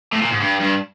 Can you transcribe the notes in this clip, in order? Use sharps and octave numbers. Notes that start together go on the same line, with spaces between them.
A2
A#2
G#2
G2
G2